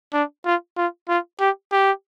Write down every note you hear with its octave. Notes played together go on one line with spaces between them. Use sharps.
D4
F4
F4
F4
G4
G4